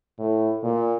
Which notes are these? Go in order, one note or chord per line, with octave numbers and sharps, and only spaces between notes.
A2
A#2